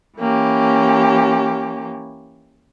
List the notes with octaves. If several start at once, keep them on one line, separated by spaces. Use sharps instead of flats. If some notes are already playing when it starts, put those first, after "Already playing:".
E3 A#3 C#4 G4